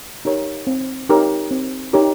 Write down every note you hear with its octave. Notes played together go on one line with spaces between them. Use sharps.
D#4 G4 A#4 C#5
C4
D#4 G4 A#4 C#5
C4
D#4 G4 A#4 C#5